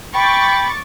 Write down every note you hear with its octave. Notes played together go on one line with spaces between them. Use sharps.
G5 B5 C#6 D6 A6